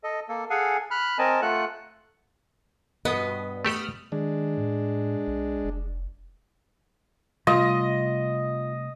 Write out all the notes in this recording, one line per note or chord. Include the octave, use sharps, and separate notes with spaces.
A4 D#5
A#3 A4
G#4 A4 F5 F#5 G#5
B5 F6 F#6
C4 A#4 D#5 G#5 A5
A3 F4 A4 F#5 F#6
G2 B2 B3 D#5
A3 G4 A4 B5 D#6 F6
D#3 G#3 D4
A2
B1
F1
C3 G3 A3 F4 D#5